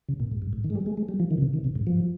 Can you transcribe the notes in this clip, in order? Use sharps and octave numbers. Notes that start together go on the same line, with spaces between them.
C#3
A#2
G#2
G2
G#2
D#3
G#3
G3
G#3
G#3
G3
F3
D#3
C#3
C3
D#3
C3
G#2
F3